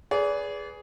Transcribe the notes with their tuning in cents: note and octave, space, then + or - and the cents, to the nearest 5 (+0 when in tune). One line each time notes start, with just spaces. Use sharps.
G#4 +0 B4 +0 D5 -35